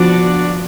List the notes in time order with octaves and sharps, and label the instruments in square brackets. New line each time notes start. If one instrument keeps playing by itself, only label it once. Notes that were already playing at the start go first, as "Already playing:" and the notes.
Already playing: [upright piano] F3 [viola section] B3 D4 F#4 D5